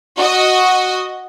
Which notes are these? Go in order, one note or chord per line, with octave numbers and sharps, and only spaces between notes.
F#4 D#5